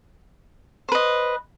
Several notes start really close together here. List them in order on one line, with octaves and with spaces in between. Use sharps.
C5 B4 D#5